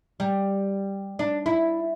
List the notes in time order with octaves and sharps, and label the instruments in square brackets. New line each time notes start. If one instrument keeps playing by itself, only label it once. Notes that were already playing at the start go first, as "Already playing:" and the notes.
[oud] G3
D4
E4